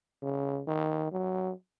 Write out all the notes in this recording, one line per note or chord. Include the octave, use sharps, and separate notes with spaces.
C#3
D#3
F#3